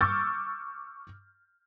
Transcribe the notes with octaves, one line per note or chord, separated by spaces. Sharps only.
C#6 D6 E6 F6 G6 A6